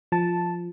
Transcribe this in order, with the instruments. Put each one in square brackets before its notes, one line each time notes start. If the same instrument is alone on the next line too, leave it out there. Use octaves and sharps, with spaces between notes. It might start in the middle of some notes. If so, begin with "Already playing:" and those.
[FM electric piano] F3 A5